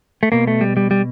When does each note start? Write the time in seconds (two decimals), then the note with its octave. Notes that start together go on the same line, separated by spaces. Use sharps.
0.23 A3
0.32 B2 A#3
0.47 A3
0.61 G3
0.77 G3
0.91 G3